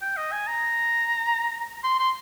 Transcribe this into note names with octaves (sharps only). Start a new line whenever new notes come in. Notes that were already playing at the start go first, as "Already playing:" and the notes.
G5
D#5
G#5
A#5
C6
C6